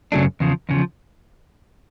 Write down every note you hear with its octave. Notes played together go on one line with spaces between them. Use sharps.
F#2 C#3 F#3 A3 D4
E2 C#3 F3
E2 C#3 F3